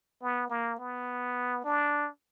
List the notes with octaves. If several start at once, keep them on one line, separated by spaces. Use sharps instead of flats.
B3
A#3
B3
D4